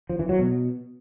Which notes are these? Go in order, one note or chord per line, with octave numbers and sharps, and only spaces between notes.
F3
E3
F#3
B2